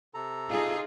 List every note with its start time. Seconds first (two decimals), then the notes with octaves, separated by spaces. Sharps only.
0.14 C3 A4 A#5
0.50 D#4 F4 G#4